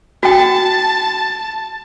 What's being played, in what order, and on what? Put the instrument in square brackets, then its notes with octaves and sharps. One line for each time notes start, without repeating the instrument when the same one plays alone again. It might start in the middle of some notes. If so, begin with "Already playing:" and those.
[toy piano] F#4 G5 [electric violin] A5